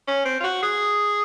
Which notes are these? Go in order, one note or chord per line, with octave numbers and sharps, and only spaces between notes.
C#4
C4
F4
F#4
G#4